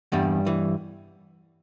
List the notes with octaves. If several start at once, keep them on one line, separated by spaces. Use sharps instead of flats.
E2 G2 G3
E3